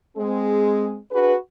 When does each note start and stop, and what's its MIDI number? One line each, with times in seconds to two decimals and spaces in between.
0.17 0.98 56
0.17 0.98 60
0.17 0.98 68
1.12 1.34 62
1.12 1.34 66
1.12 1.34 68
1.12 1.34 71